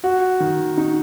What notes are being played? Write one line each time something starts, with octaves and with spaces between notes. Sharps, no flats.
F#4
D#3
D#4